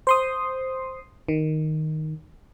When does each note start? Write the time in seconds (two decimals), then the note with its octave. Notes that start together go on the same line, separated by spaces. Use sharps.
0.07 C5 C6 D#6
1.28 D#3